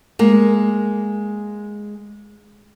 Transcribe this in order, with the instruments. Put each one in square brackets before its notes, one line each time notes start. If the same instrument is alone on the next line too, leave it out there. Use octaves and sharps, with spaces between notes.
[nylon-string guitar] G#3 A#3